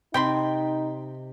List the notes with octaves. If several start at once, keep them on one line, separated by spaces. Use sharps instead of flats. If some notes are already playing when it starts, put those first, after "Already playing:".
C3 D#4 G5 B5 C6